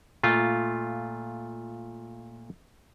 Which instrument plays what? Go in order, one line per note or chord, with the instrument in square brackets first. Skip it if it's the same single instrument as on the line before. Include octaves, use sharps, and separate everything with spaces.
[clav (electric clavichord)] A#2 A3 F4